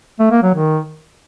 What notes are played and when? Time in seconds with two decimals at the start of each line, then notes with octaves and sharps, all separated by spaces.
0.19 A3
0.31 A#3
0.43 F#3
0.54 D#3